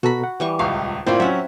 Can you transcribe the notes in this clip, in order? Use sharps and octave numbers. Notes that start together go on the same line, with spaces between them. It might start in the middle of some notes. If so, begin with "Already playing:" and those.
B2 F#4 A4 A#5 B5
F#5
E3 G3 C#6
D#1 C#2 F5 C#6
A2 A#3 C4 E4 F4 C5 D5
F#3 C#4 E5 F#5